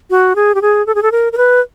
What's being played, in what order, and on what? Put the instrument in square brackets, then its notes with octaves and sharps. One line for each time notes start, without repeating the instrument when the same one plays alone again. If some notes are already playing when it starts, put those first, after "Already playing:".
[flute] F#4
G#4
G4
G#4
A4
G#4
A4
A#4
A#4
B4